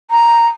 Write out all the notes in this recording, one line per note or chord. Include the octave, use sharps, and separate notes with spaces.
A#5